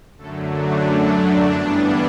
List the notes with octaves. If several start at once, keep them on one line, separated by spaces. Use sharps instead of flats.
F#2 D3 F#3 A3 A4
D4
D4
G2 E3 G3 B3 D4